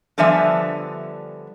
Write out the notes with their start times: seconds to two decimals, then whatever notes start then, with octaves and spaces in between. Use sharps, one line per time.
0.18 D3 F3 G3 B3 E5 G#5